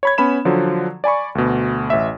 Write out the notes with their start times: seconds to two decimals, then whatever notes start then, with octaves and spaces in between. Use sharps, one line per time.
0.03 C#5 B5 G#6
0.18 B3 C#4 B5 E7
0.45 D3 F3 F#3
1.04 D5 G#5 B5 C#6
1.35 D2 B2
1.90 A1 E5